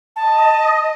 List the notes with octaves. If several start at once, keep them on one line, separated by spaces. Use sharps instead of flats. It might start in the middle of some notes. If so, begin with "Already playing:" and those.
D#5 A5